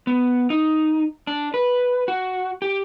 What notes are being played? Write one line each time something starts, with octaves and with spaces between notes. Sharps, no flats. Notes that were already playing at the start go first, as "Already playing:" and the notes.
B3
D#4
D4
B4
F#4
G4